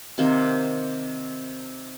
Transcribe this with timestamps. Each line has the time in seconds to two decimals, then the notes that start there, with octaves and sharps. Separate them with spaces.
0.18 C3 D#3 A#3 C5